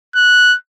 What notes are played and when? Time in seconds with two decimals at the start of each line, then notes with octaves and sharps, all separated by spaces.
0.15 F#6